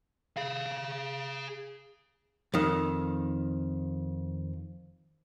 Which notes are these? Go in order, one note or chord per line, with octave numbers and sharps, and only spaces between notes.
G#4 F5
F2 D#3